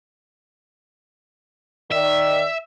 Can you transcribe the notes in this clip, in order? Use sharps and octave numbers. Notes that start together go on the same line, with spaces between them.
D#3 D5 E5